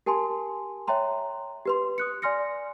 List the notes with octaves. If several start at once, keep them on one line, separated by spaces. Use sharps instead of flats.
G4 A#4 G#5 A5 C6
C#5 E5 G5 A#5 C6
G4 B4 C6
D#6 F#6 C#7
D5 G#5 C6 F6 A#6 C#7